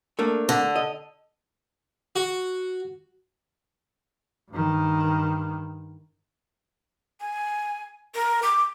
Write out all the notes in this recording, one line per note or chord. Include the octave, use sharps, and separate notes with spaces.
A3 A#3 D4
D3
D#5
F#4
G2 D#3
G#5
A#4
D6